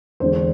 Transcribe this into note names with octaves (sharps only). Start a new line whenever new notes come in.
E2 D3 G#3 C5